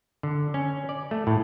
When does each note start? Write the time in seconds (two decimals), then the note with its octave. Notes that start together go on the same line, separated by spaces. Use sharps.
0.23 D3
0.54 C#4
0.89 D5
1.11 A3
1.27 A2